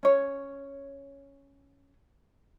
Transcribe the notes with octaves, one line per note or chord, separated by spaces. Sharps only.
C#4 C#5